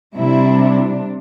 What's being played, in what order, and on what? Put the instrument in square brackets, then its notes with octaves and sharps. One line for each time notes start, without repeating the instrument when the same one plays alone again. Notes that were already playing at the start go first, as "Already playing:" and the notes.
[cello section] C3 G3 D4 E4